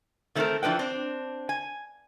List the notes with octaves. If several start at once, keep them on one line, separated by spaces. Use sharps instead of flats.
D#3 A3 C4 D4 A4 A#4
E3 F3 D4 B4 G5
C4 D4
G#5